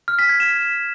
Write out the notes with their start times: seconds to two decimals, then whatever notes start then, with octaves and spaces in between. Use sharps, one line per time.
0.08 F6
0.19 B6
0.29 G#6
0.40 E7